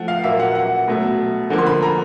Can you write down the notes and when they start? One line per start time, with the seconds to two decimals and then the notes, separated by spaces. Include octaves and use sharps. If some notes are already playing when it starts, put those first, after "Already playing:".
Already playing: F3 A3 F#5
0.08 F5
0.24 A#2 F#3 A#3 E5
0.40 F#5
0.55 F#5
0.88 B2 F#3 A3
1.50 D3 F3 A#3
1.58 C6
1.66 B5
1.82 A#5